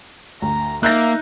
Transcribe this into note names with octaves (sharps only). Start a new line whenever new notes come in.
D2 A#5
A#3 D#4 E5 F#6 G6 A#6